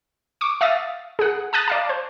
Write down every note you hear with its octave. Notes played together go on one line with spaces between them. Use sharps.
C#6 D6
E5 F5 D#6 A6
G#4 F#5
A5 D#6 F#6 A6
D5 F5 A5
C5